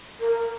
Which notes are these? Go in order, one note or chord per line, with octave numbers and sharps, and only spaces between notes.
A#4